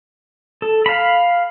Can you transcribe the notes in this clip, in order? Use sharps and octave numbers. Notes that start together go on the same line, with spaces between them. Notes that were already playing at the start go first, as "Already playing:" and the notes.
A4
F5 B5